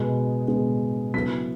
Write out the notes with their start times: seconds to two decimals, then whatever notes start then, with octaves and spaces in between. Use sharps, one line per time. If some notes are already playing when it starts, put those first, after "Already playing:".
Already playing: B2 G#3 B3
0.48 B2 G#3 B3
1.14 C#3 F#3 B3 E4 B6